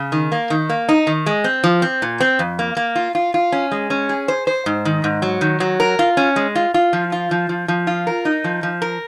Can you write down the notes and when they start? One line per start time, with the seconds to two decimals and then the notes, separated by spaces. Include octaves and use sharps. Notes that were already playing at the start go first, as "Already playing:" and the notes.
Already playing: C#3
0.12 D#3
0.32 A#3
0.50 D#3
0.70 A#3
0.89 D#4
1.07 D#3
1.26 G#3
1.44 C4
1.64 F3
1.82 C4
2.02 A#2
2.20 C4
2.39 F2
2.59 A#3
2.77 A#3
2.95 F4
3.15 F4
3.34 F4
3.52 C#4
3.71 G#3
3.90 C#4
4.09 G#4
4.28 C5
4.47 C5
4.66 G#2
4.85 D#3
5.04 G#2
5.22 F#3
5.41 D#3
5.60 F#3
5.80 A#4
5.99 F4
6.17 C#4
6.36 G#3
6.55 F4
6.74 F4
6.93 F3
7.12 F4
7.31 F3
7.49 F3
7.68 F3
7.87 F4
8.07 A#4
8.25 D#4
8.44 F3
8.63 F3
8.82 A#4